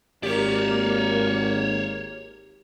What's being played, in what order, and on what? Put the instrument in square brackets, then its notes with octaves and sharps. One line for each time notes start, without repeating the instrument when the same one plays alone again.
[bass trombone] G#1 [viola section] A#3 [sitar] G4 [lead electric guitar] C#5 D5